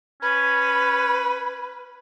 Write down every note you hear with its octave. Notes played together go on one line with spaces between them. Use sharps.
C#4 B4